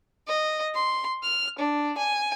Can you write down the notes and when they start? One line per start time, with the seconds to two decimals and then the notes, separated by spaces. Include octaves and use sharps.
0.27 D#5
0.74 C6
1.23 F6
1.58 D4
1.97 G#5